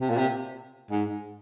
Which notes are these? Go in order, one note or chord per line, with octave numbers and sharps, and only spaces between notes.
C3
A#2
C3
G#2